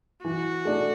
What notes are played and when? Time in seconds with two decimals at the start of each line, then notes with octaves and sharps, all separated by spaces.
0.25 E3 F#4
0.65 A3 D4